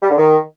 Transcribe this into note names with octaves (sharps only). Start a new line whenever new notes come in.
G3
D3
D#3